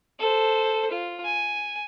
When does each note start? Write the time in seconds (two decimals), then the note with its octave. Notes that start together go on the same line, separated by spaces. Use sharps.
0.19 A4 C5
0.91 F4
1.25 G#5